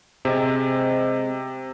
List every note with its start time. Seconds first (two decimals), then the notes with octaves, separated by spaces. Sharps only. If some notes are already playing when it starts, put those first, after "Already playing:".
0.25 C3 G3 G#3 C4